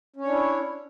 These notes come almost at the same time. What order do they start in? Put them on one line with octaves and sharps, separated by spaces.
C#4 C#5 D4 E4